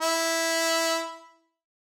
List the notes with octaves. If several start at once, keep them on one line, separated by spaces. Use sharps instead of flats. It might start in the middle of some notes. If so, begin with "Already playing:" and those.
E4